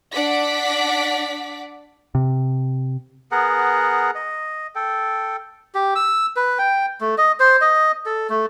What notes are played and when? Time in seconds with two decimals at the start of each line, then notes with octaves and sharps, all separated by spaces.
0.13 D4 D5 F#5 D6 B6
2.15 C3
3.31 B3 G#4 A#4 F#5
4.15 D#5
4.75 A4 G5
5.75 G4
5.95 E6
6.36 B4
6.59 G5
7.01 A3
7.18 D#5
7.40 C5
7.61 D#5
8.06 A4
8.29 A3